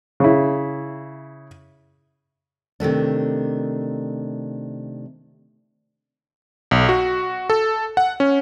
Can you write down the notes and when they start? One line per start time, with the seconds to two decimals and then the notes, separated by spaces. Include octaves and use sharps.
0.20 C#3 E4
2.80 C3 D#3 A3 D4
6.71 B1
6.89 F#4
7.50 A4
7.97 F#5
8.20 C#4